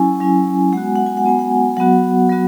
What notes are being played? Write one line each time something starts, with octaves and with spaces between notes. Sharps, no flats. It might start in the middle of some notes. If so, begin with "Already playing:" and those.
Already playing: F#3 C#4 E4 G#5
F#3 C#4 E4
G#3 B3 F#4 F#5
G#5
F#5
G#5
F#5
G#3 B3 F#4 G#5
F#5
F#3 B3 F#4 F#5
F#3 B3 F#4